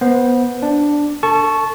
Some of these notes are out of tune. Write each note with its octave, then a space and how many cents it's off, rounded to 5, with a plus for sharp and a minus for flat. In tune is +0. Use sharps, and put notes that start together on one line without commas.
B3 -15 C5 +0
D4 +0 D5 +0
A4 +35 A5 -15 C#6 +0